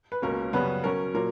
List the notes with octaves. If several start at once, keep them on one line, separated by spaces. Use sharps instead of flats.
B4
C#2 B2 A#3 C#4 A#4
F#2 C#3 G3 B3 B4
B2 F#3 C#4 A#4
A#2 F#3 A#4